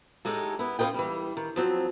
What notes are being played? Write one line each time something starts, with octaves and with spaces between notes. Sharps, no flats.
A2 G#3 D#4 G4 A4
B3 E4
C#4 F4 G#4 B4 D#5 G5
E3 G3
D#3
F3 F#3 C4